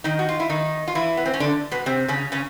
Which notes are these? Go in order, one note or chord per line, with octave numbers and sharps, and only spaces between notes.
D#3 D#4
F#4
F4
E4
D#3 D#4
F4
E3 E4
B3
C4
C#4
D3 D4
B2 B3
C3 C4
C#3 C#4
C#3 C#4